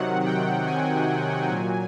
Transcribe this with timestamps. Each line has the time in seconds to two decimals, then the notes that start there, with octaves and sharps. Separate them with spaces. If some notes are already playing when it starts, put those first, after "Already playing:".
Already playing: C3 D#3 F#3 F#5
0.26 G5
0.66 G#5
1.49 A#2 F#3